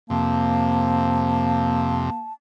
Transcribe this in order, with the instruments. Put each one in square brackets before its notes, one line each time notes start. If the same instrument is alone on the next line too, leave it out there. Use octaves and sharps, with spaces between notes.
[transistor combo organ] F2 C3 [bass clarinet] A#3 [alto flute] A5